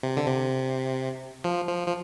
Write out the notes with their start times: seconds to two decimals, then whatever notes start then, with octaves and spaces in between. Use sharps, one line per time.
0.03 C3
0.17 D3
0.27 C3
1.44 F3
1.68 F3
1.88 F3